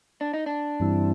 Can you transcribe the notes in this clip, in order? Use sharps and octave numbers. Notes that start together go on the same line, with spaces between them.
D4
D#4
D4
G2 E3 G3 C4 E4